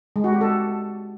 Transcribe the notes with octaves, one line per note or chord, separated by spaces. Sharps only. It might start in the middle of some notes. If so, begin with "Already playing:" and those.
G#3
F#4
G4
A4